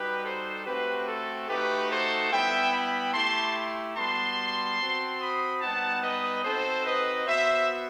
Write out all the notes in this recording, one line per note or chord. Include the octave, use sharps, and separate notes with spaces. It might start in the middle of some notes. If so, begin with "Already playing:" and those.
Already playing: G3 D#4 F#4 G4 B4
A4 C5
A3 C4 F#4 G4 B4
A4
A3 D#4 F#4 G4 B4
A4 C5
G3 B3 E4 E5 G5
G5 B5
A3 E4 G4 A5 C6
G3 B3 F#4 A5 C6
C4 F#4
B5 D#6
G3 B3 D#4 F#5 A5
B4 D#5
C4 D#4 F#4 A4 C5
B4 D#5
B3 F#4 C5 E5